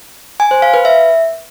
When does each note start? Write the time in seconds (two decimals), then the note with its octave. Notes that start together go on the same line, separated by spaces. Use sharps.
0.40 G#5
0.51 C5
0.62 F5
0.74 B4
0.85 E5